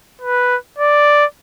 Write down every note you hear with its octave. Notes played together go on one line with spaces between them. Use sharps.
B4
D5